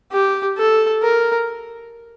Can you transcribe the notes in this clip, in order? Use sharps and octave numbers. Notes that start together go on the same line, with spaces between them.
G4
A4
A#4